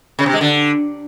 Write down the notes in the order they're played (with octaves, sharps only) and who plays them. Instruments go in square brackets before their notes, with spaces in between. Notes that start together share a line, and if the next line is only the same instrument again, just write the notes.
[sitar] C#3
C3
G#3
D3